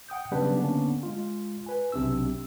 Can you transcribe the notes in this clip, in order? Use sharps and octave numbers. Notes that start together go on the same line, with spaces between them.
F#5 G5 D#6 G6
C#3 F#3 G3 B3 D4 B4
D3 A#3 B3 C#4 D4
G#3 F4
B4 G#5
B1 C3 C4 D4 E6